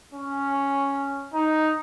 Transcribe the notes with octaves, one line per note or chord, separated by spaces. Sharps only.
C#4
D#4